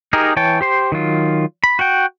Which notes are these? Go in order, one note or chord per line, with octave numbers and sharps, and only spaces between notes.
D#4 G4 G#4 A#4
E3 C#5 G5 A5
G4 C5 C6
D#3 F#3 F4
B5
F#4 F#5 G5